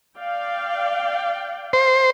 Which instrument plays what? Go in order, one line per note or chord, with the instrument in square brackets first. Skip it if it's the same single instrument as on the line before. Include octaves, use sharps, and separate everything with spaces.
[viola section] D5 F5 G5
[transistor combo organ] C5